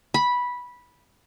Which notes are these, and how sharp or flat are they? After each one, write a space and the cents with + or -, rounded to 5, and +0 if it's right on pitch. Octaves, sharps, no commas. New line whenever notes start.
B5 -10